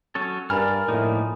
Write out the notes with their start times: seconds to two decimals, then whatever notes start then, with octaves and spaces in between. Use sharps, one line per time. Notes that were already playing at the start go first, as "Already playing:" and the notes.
0.15 F#3 C#4 A4
0.50 G2 A#4 D5 G#5 A#5 B5 F6
0.89 A2 F3 A#3 D#4